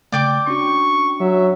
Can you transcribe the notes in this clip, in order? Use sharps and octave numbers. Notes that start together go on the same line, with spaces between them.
C#3 A3 D5 G5 D6
C#4 D4 F#4 C#6
F#3 E5